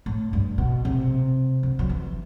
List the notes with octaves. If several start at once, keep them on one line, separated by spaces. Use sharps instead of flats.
A2
G2
B2
C3
D3
F#3
E3